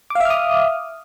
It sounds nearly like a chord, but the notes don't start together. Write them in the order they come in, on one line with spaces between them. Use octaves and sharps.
D6 F5 E5 F6 D#6